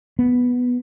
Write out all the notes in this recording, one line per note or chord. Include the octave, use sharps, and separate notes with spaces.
B3